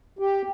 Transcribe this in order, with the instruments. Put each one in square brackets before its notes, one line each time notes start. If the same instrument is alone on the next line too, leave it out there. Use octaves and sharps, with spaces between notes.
[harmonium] G4